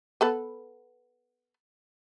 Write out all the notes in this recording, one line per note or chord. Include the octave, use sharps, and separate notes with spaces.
B3 A4 B4